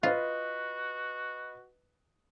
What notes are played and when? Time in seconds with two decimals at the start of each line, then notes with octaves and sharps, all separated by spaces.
0.03 F4 F#4 B4 D#5